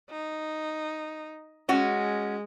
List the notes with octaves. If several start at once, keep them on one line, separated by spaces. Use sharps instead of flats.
D#4
G#3 C#4 F#4